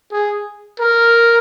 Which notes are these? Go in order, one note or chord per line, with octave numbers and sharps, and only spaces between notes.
G#4
A#4